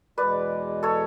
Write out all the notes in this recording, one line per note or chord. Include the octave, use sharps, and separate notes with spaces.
E2 B2 G#3 B4 D5
A4 C#5